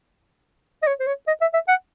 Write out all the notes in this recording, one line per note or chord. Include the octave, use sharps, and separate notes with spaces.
D#5
C#5
C5
C#5
D#5
E5
E5
F#5